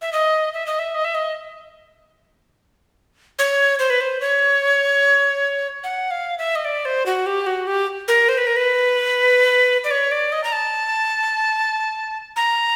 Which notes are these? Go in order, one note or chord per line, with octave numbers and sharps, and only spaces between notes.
E5
D#5
E5
D#5
E5
D#5
E5
D#5
C#5
C5
B4
C5
C#5
F#5
F5
E5
D#5
D5
C5
F#4
G4
F#4
G4
A#4
C5
B4
A#4
B4
D5
C#5
D5
D#5
A#5
A5
A#5